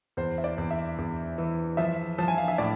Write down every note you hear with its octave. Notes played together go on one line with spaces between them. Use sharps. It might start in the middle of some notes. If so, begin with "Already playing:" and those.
E2 C5
E5
D5
E2
E5
E2
E3
F3 E5
F3 A5
G#5
F5
E5
A2 D5